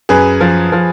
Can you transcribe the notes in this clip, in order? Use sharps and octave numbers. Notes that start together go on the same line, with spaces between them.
F#2 G#4 B4
F3
F3